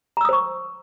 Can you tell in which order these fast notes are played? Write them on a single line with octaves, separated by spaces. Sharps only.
A#5 E6 D#6 C5 C#6